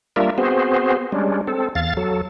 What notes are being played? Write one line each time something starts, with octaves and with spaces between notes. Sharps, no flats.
G3 A#3 D4 F4 A#4 E5
B3 C4 F#4 G#4 C5
G3 G#3 C#4 D4
C4 A4
E2 F5 A6
F#3 A4